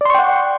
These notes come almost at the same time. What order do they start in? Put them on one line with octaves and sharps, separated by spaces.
D5 C6 C#6 G5 F#5